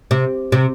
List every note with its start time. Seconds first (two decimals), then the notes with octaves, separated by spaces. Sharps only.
0.11 C3
0.52 C3